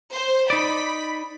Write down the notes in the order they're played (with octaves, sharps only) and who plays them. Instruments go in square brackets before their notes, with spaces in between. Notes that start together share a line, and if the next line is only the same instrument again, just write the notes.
[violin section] C5
[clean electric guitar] D#4 D5 [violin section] B5 B6